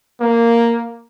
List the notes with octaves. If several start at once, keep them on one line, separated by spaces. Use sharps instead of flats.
A#3